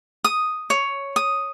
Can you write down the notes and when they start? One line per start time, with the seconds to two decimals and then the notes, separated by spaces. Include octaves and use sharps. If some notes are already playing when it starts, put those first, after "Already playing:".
0.24 D#6
0.70 C#5
1.16 D#6